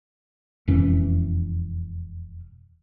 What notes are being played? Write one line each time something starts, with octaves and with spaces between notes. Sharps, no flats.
E1 F2 E3 C#4